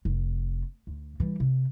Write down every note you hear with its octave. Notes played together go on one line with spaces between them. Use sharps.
F1
D2
E3 G3
C3